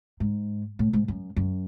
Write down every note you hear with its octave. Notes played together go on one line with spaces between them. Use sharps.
G#2
A2
G#2
F#2
F#2